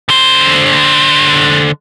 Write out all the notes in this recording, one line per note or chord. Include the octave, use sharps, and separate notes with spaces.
D3 C5